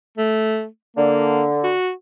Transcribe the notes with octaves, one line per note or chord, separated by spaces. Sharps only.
A3
D3 A#3
F#4